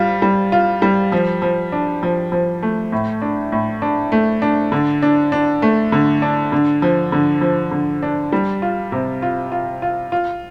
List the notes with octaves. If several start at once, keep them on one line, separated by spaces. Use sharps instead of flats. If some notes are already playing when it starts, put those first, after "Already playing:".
Already playing: G3 F4
G3
F4
G3
F3
F3
D4
F3
F3
A3
A2
D4
A2
D4
A3
D4
D3
D4
D4
A3
D3
D4
D3
F3
D3
F3
D3
D4
G3
F4
C3
F4
F4
F4
F4